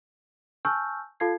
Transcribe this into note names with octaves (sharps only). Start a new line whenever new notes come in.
G#5 A5 C#6 E6 F6 G6
F4 A4 F5 A5 G#6 C7